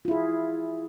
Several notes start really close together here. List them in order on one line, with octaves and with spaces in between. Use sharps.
F4 E4 G#4